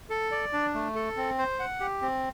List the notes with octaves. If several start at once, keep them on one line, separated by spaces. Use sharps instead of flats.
A4
D5
D4
A3
A4
C4
C5
F#5
G4
C4